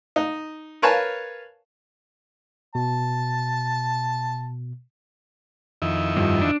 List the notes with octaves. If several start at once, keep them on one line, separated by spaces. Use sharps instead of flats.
D#4
A#4 B4 C#5 F5 G#5 A5
B2 A5
F2 D#3 E4
G2 F3
D4